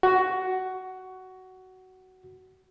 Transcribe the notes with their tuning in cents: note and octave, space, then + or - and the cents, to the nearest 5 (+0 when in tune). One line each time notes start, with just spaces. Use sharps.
F#4 +15